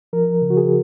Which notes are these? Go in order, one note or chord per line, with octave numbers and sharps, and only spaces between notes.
F3 A#4
C#3
F#4
G#4